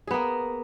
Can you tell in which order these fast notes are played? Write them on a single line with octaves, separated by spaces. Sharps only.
G#4 B3 A#3